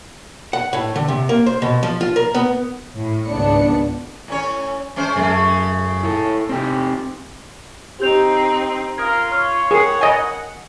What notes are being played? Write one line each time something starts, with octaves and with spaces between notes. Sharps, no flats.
F#5
A2
D3
C3
A#3
C5
B2
F3
F4
A#4
B3
A2
G#1 C#2 G#2 B3 D4 C#7
A2 C#4 C#5
G#3 C#4 C5
F#2 C#3 G#3 A3
E4 A4
C4 D#4 G4
C4 D#4 G4 G6 F7
F4 A#4 D#6 G#6
C#5 F6
G#4 A#4 F#5 G5 C7
D#5 G#5